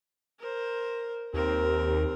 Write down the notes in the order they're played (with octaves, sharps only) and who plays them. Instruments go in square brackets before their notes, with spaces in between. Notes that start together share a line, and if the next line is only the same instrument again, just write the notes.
[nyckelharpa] A#4 C5
[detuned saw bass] D#2 [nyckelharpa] C4 A#4